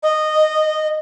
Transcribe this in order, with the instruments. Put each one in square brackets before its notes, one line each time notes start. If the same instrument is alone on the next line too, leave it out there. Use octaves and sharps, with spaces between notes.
[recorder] D#5